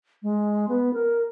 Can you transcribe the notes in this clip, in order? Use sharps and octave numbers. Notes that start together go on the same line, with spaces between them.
G#3
B3
A#4